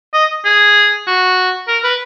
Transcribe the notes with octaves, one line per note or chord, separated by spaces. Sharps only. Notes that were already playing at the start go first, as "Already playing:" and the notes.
D#5
G#4
F#4
A#4
B4